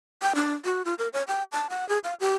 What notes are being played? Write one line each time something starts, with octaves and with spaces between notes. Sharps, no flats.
G5
D4
F#4
F4
A#4
C#5
G5
A5
F#5
G#4
F5
G4